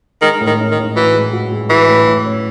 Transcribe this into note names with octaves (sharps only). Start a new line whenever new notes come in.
D#3 G#3
A2
D#3
C#4
D#3
A2
E3 F#4
G#3
F#4
G#3
E3 F#4
A2
A2
C#4